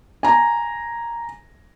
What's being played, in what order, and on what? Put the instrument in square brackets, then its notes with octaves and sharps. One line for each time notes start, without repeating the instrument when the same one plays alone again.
[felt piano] G#5 A#5